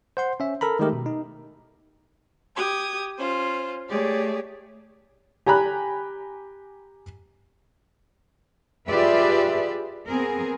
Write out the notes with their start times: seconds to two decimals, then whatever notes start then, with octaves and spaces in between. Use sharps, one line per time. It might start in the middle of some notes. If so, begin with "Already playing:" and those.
0.17 C5 F#5 C6
0.40 C#4 E5
0.61 A4 A#4 A#5 B5
0.79 D#3 G#3 A3 D#4 G4 A#4
0.93 B2
1.06 D#4
2.55 G4 D#6 G#6
3.18 C#4 F4 C5
3.89 A3 G4 G#4 C#5 D5
5.46 G4 G#5 A#5 B5 F#6
8.88 F4 G4 G#4 B4 D5 E5
10.07 B3 C4 G#4 A#4